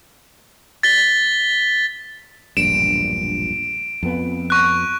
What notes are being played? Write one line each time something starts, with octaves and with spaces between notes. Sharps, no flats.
A6 B6 G7
E1 A#1 G2 D7 E7
F2 B3
C#6 F#6